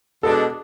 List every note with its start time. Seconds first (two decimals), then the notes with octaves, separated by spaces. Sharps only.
0.23 B2 G#3 D4 A4